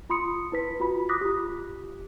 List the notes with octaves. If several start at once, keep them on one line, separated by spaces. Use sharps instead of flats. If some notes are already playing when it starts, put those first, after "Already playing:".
F4 B5 C6 D#6 C#7
E4 B4 B6
F4 F#4 B5
D6 D#6 F#6 A#6 B6
F4 G4